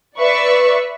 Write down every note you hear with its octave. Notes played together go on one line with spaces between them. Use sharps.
B4 D5 E5 C#6